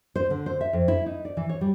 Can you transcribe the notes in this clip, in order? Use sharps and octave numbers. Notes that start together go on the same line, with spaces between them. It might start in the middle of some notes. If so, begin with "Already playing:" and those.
C5
D3
C5
E5
F2
E4
D#4
D5
E3
C#5
G3